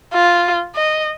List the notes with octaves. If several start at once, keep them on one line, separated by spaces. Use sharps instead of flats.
F4
D#5